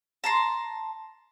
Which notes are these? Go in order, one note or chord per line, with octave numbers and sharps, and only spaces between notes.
A5 A#5 C6